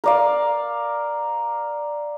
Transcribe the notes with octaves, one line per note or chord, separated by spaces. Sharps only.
A#4 D5 F5